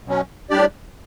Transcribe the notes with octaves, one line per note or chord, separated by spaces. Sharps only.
B2 F#3 C#4
A2 G3 D4 G4 D5